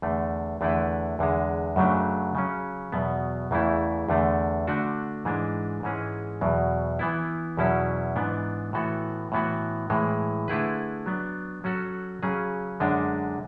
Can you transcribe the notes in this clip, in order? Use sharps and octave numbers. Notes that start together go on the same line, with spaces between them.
E2 D3 A3
E2 D3 A3 E4 B4
E2 D3 G#3
F#2 C#3 F#3 A3 D4
C#3 F#3 C#4
E2 B2 F#3 B3
E2 C#3 E3 A3 E4
E2 D3 A3
D3 A3 D4 F#4
G#2 E3 G#3 D4
G#2 E3 G#3 C#4 G#4
E2 B2 F#3
E3 B3 E4
E2 B2 F#3 C#4 E4
G#2 E3 B3 D4
A2 E3 B3 F#4 A4
A2 E3 B3 F#4
A2 E3 G#3
D3 A3 E4 G#4 B4
F#3 B3 D4
F#3 C#4 F#4 A4
C#3 F#3 C#4 G#4
F#2 D3 G#3 D4